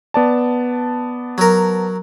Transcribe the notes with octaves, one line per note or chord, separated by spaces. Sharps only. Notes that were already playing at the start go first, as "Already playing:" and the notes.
B3 D5 A5
F#3 A#4